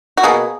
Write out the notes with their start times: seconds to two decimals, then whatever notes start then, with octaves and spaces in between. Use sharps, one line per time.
0.17 F#4
0.23 B2 A#3 G#4